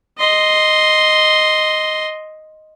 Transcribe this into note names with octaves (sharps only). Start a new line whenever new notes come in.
D#5 C6